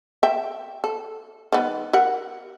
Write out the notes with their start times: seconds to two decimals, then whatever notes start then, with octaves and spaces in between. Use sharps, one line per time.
0.23 E5 G5
0.84 A4
1.52 D#3 G3 B3
1.93 G4 A#4 F#5